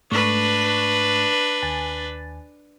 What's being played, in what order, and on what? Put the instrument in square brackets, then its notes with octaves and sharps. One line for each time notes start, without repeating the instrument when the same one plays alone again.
[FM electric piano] G#2 A3 C#6 [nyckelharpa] D4 B4
[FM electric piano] D#2 G#5 A6